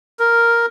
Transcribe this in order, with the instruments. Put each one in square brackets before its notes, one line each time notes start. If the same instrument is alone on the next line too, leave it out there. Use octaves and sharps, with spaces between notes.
[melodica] A#4